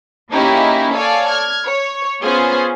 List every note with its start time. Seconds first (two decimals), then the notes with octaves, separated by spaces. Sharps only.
0.31 A#3 C#4 D#4 E4 G4 G#4
0.93 A4 C#5 D5 F5 G#5
1.29 F6 G#6
1.66 C#5
2.22 B3 C#4 F4 G#4 C5